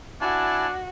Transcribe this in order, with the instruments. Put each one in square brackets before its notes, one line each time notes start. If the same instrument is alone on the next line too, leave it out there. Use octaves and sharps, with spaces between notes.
[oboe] D4 [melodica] E4 G#5 A5 [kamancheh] F#4